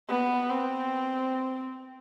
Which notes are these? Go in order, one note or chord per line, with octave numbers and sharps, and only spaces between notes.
B3
C4